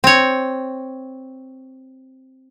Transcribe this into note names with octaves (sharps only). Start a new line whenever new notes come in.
C4 C#5